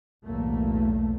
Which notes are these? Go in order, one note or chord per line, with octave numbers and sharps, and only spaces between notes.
B1 E2 A2 A3 A#3